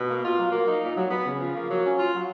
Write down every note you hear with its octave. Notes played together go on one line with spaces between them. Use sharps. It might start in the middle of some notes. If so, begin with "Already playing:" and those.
Already playing: B2
A#3
F4
F#3
A#3
D#4
A#2
F#3
B3
C#3
F3
A#3
F#3
C#4
F4
F#3